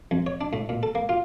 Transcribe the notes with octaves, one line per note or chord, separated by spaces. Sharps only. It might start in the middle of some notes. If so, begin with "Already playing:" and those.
F2
C#5
D4
A2
A#2
A4
A#3
F4